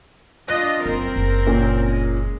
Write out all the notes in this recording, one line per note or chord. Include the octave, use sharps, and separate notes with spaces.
D4 F4 D#5 F#6
F#1 C4 A#4
F#1
A#2 C#4 C#5
G#3